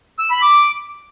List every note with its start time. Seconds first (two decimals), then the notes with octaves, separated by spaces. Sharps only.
0.19 E6
0.31 B5
0.42 D6